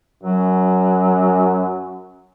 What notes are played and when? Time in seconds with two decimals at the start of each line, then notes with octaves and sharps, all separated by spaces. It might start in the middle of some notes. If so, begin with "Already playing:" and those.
0.23 F#2 F#3